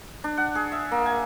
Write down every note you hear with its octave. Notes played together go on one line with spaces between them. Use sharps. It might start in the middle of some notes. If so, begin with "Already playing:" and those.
D4
F#5
G#4
E5
A#3
G#5